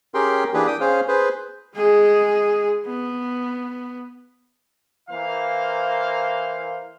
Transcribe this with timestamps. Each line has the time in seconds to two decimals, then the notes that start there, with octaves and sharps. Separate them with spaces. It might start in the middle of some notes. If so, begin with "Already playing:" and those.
0.14 C#4 G4 G#4 A#4 G5 C6
0.54 E3 A#3 D4 G4 G#4 B4
0.67 G5 D#6
0.81 C#4 G#4 C5 F5
1.08 G#4 B4 C5
1.75 G#3 G#4
2.86 B3
5.09 E3 A#3 C5 F5